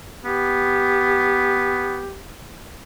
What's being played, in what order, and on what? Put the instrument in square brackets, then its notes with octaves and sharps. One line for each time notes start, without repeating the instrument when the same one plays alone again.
[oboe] B3 [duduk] G4